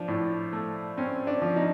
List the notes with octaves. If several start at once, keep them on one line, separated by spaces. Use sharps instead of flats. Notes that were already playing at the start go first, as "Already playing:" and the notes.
Already playing: F3 D4
A2
A3
C4 C#4
D4
F3
D#4